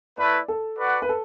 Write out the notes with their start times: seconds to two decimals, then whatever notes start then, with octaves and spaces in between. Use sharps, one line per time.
0.18 A3 E4 B4 D5
0.48 A4
0.79 F#4 B4 D5 F#5
1.02 B4
1.09 A4